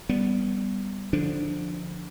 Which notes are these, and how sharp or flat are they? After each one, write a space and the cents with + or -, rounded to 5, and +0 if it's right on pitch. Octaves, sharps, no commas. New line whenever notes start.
G3 +0 B3 +0
D3 +0 F3 +0 D4 +0